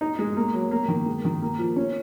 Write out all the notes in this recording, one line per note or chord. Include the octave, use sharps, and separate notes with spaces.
D#4
G#3
A#3
F#3
A#3
D#3
G#3
D#3
A#3
F3
C#4